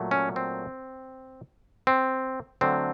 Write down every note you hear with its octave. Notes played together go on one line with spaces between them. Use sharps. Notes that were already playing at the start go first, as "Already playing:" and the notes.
Already playing: A#2 F#3 A3
C#4
C4
C4
D3 F#3 A3 C4